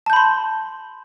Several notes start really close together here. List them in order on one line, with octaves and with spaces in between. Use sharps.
A5 G6 B5 C6